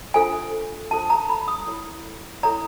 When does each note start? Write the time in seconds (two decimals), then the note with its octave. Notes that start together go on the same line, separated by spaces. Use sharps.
0.14 D4 F4 A4 C5 G#5
0.91 D4 F4 A4 C5 A5
1.10 A#5
1.30 B5
1.48 D#6
1.67 E4 A4 C#5
2.43 E4 A4 C#5 A#5